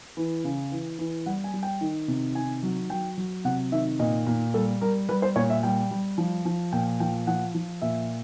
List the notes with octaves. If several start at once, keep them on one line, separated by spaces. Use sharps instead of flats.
E3
C#3
E3
E3
G3 F#5
G#5
G3
G5
D#3
C3
D#3 G#5
F#3
F#3 G5
F#3
C3 F#5
D#3 E5
A#2 D#5
A#2
G3 A4
G3 A#4
G3 B4
C5
A#2 C#5
E5
G3 G5
G3
F3
F3
A#2 G5
F3 G5
F3 F#5
F3
A#2 E5